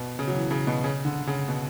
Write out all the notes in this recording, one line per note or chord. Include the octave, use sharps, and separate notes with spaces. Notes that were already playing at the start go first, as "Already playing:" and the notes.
Already playing: B2
C#3
F#3
E3
C#3
B2
C#3
D3
C#3
B2